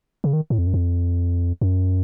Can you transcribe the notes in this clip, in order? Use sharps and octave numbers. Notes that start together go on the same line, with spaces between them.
C#3
D#3
A2
F2
F#2
F2
F#2